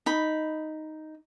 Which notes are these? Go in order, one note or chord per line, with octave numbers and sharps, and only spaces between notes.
D#4 B5